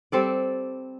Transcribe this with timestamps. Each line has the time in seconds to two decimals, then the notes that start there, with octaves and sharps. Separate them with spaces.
0.12 G3 C4 A4 D5